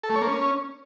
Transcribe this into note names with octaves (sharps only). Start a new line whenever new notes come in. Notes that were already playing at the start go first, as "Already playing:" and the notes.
A4
A3
C#5
A#3
C#4